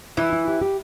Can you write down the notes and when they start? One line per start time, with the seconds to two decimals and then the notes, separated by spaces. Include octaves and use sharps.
0.17 E3 E4
0.33 E4
0.48 G4
0.62 G4